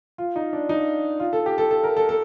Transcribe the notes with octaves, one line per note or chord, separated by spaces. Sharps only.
F4
D#4
D4
D#4
F4
A4
G4
A4
A4
A#4
A4
A4